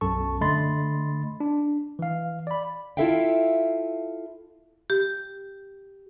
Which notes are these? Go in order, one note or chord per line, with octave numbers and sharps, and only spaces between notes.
B1 F#2 A4 A5 C#6
D3 A3 D#5 B5 C6 A6
D4
E3 F5
D5 B5
E4 F4 A4 E5 F5 G5
G4